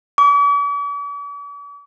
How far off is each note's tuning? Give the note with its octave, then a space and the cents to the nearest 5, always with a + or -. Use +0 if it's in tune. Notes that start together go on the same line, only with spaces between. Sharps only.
D6 -45